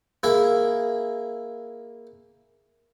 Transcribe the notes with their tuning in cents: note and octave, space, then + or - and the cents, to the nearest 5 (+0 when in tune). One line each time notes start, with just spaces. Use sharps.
A#3 +0 E4 +0 G#4 +0